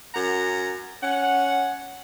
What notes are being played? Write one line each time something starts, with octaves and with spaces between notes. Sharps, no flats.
F#2 F#5 A#5
C#4 F#5